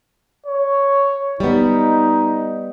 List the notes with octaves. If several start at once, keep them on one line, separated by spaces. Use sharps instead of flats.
C#5
G3 B3 D#4